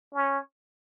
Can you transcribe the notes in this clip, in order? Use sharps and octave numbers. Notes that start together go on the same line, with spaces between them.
C#4